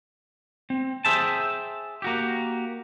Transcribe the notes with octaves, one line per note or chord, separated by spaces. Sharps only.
C4
G#4 C5 E5 G5 A5
A#3 F#4 G4